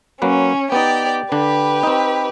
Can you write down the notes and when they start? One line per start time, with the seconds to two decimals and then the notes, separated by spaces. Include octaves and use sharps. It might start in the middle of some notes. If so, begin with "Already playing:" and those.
0.22 F#3 A#3 C#4 B4
0.72 B3 D#4 G4 D5
1.32 D3 D4 G4 B4
1.83 C4 D#4